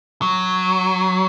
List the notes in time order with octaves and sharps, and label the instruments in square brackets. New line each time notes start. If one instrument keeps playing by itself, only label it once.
[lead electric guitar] F#3